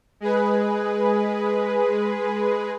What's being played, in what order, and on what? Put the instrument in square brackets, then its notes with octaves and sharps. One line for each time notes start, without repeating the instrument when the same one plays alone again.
[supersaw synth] G#3 G#4 B4